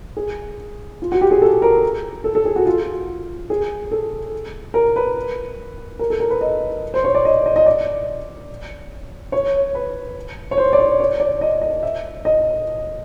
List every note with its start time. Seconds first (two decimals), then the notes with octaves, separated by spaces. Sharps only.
0.17 G#4
1.02 F4
1.12 F#4
1.21 G4
1.31 G#4
1.42 A4
1.62 A#4
2.24 A4
2.35 A4
2.45 G#4
2.56 F#4
2.66 F4
3.50 G#4
3.91 A4
4.74 A#4
4.96 B4
5.99 A#4
6.10 A4
6.20 A#4
6.30 B4
6.41 D#5
6.94 C5
7.04 C#5
7.15 D5
7.25 D#5
7.46 D#5
7.56 D#5
7.66 D5
9.32 C#5
9.75 B4
10.51 C#5
10.58 C5
10.73 D5
10.79 C#5
11.00 C#5
11.20 D5
11.41 D#5
11.61 D#5
11.83 E5
12.25 D#5